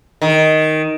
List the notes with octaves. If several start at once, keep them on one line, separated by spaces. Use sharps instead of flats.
D#3